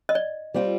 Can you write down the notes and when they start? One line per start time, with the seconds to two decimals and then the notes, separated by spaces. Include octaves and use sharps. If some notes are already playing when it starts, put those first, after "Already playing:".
0.09 D#5
0.15 D5
0.54 G3 C4 F4